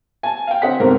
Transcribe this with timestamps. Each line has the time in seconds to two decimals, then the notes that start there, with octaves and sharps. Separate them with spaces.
0.23 G#5 A5
0.47 F5 G5
0.62 D3 C4 D#5 F#5 B6
0.80 G1 G#2 C3 A3 C4 A#4